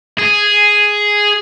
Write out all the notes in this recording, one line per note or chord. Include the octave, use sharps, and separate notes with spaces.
G#4